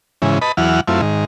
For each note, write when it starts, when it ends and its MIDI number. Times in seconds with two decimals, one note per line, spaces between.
0.22 0.39 44
0.22 0.39 49
0.22 0.39 52
0.41 0.52 71
0.41 0.52 75
0.41 0.52 81
0.41 0.52 83
0.57 0.80 40
0.57 0.80 52
0.57 0.80 54
0.57 0.80 78
0.57 0.80 89
0.88 1.01 42
0.88 1.01 57
0.88 1.01 60
0.88 1.01 64
0.88 1.01 65
1.02 1.25 44
1.02 1.25 51